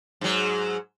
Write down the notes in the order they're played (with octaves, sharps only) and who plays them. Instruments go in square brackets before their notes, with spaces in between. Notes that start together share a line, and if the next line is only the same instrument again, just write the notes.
[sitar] G#2 F#3